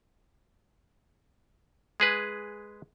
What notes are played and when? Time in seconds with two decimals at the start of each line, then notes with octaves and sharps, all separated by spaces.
2.00 G#3 G#4 B4